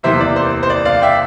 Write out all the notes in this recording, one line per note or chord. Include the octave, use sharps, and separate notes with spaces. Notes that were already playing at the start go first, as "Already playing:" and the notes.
E2 C3 E3 A#3 C5 E5
D5
C5
C5
D5
D5 F5
E5 G5